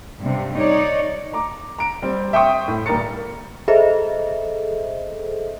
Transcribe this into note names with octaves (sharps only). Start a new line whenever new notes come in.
G2 C3
D#4 C#5 D5
A#5 D6
A#5 D7
G3 C4
E5 G5 C6 C#6 D#6
A2
D#1 G3 A#3 A#5 A6 C#7
G#4 A4 C5 D#5 E5